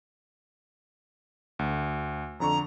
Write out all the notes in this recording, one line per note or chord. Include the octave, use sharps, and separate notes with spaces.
D2
F2 D3 A#5 C#6